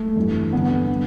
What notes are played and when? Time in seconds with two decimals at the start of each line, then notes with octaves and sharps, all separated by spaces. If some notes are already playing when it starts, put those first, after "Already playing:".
Already playing: A3
0.16 G2 E3
0.53 G2 D3 B3
0.91 D3